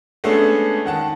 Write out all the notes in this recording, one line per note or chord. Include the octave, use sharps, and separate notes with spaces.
G#3 A3 B3 C#4 D4 A4
D#3 F#5 A5